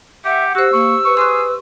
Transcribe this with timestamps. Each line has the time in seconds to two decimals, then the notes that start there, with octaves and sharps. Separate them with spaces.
0.25 G4 E5 F#5
0.55 F#4 G4 C5 E6
0.73 A#3 C#6
1.05 B4 C#6
1.17 G#4 C6 C#6 F#6